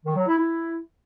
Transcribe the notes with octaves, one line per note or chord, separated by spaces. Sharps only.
D#3
F#3
E4
E4